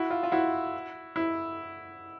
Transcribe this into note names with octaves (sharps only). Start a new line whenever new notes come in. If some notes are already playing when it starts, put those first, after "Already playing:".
Already playing: E4 F#4
F4
F4
E4 F#4
E4